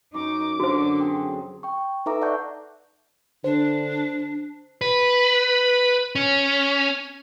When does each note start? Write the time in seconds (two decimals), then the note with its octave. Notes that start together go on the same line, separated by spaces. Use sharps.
0.14 F#2 D#4 D6
0.60 F#2 D3 F#4 C5
0.99 C4 G#4
1.63 G5 C#6
2.06 D#4 A4 B4 E5 A#5 D6
2.21 D5 E5 F#5 A5 C#6 G6
3.44 D3 D4 C5
4.81 B4
6.15 C#4